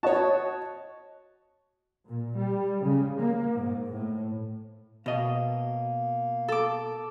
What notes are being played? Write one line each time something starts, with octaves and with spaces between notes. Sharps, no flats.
F#4 C#5 D#5 A5
A#2
G3
C#3
A#3
G#2
A2
B2 A#3 D#5
A4 D6